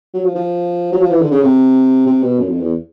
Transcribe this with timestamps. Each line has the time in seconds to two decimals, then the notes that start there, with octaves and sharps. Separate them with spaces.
0.14 F#3
0.24 F3
0.35 F3
0.92 F#3
1.01 F3
1.10 E3
1.22 D3
1.31 C#3
1.43 C3
2.06 C3
2.23 B2
2.39 F#2
2.49 F2
2.60 E2